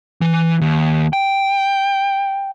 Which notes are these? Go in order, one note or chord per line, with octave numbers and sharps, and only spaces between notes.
E3
D#2
G5